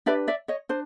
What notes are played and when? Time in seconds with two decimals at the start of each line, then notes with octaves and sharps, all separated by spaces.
0.06 D4 G4 B4 D5 E5
0.28 D5 E5
0.48 C#5 D#5
0.69 D4 C5